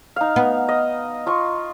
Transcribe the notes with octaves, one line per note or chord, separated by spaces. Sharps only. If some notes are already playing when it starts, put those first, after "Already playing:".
D#4 F5
B3
D#5
F4 C6 C#6